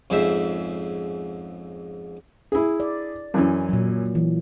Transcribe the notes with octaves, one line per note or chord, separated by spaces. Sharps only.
F2 G#2 C#3 C5 E5
E4 G#4
D5
F#2 E3 C#4
A#2 F#3
E3